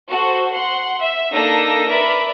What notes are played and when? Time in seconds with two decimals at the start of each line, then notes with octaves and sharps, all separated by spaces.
0.10 F#4 A4 C5
0.53 F#5 C6
1.01 E5
1.33 A#3 D4 D#4 A4 E6 A#6
1.89 A#4 B4 D5 E5 B5